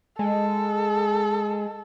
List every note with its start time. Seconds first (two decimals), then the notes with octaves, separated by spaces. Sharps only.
0.19 G#3 A4